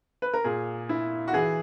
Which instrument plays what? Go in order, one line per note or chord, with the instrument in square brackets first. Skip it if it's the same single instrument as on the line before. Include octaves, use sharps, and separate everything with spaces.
[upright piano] B4
A#4
A#2 G#4
E4
F#4
E3 G#4